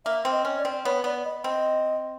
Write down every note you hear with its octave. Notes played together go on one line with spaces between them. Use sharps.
A#3 E5
C4
D#5
C#4
D5
C4
B3 C#5
B3 D5
D#5
C4 D#5